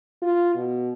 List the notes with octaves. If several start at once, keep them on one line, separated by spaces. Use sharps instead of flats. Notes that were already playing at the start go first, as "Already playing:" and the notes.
F4
B2